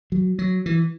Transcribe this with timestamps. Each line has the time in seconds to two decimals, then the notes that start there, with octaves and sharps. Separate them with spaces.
0.12 F#3
0.39 F#3
0.66 E3